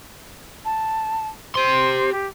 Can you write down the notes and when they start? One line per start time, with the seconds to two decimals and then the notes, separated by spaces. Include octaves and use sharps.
0.65 A5
1.55 G4 C5 C6
2.12 G4